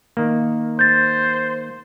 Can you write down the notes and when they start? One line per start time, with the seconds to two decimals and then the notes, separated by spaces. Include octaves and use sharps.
0.17 D#3 A#3
0.79 C5 G6 A6